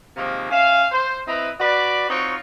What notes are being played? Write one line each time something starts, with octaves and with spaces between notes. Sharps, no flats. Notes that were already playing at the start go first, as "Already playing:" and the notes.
C3 D#3 F3 G#3 A#3
C#4 E5 F5
C5
C4 E4 B4 D#5 A#5
F#4 B4 D5
C4 D#4 F4 F#4 C#5